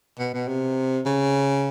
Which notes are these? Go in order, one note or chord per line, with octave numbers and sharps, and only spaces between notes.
B2
B2
C3
C#3